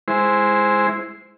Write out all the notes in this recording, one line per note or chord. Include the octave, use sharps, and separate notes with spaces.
G#3 E4 C5